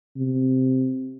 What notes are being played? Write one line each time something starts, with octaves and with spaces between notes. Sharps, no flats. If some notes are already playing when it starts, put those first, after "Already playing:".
C3